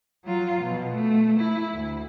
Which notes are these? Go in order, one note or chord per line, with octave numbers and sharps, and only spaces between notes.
F#3 F4
B2
A3
E4
D2